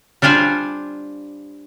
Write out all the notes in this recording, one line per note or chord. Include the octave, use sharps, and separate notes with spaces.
G3 D4 F4 C5 G#5